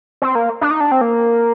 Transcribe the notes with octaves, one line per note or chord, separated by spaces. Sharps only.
C4
A#3
D4
D#4
D4
C4
A#3